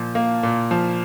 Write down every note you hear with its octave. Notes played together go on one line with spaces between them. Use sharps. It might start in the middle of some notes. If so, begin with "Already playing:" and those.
Already playing: A#2 F3
A#3
A#2
F3